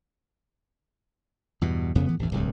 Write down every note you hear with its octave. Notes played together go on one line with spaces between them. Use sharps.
E2 G2 B2
F1 F2 C#3 B3
A2 E3 F3 B3
A1 E2
D1 C2 G2